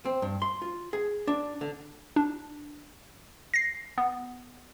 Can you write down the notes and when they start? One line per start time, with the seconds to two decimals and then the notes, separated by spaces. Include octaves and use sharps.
0.05 C4
0.22 G2
0.42 C6
0.62 F4
0.93 G#4
1.27 D4
1.61 D3
2.16 D4
3.54 A#6 C7
3.98 B3